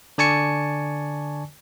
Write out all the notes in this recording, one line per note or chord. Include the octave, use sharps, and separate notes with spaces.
D3 D5 G#5 A5 C#6 C#7